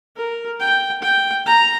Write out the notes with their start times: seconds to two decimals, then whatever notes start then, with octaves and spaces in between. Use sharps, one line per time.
0.16 A#4
0.60 G5
1.02 G5
1.46 A#5